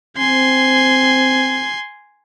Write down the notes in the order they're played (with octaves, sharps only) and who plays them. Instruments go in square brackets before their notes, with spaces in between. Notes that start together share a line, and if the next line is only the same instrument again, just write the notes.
[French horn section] C4 [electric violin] G#5 C6